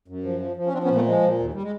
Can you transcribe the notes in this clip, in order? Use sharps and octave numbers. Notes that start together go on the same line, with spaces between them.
F#2
F3
F3
F3
C#4
F3 C4 D4
B3 C#4
A#2
A3 B3
F3 G#3
A#2
D#2
G3
G#3